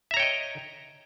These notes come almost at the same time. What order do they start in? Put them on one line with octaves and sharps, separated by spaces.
E5 A#5 C#5 G5 D#5